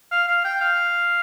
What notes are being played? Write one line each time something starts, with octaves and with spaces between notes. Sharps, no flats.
F5
F5
G5
F5